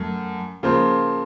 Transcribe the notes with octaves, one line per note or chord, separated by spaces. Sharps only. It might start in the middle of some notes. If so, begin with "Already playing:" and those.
Already playing: F#2 A3
C#3 F3 A#3 F4 C5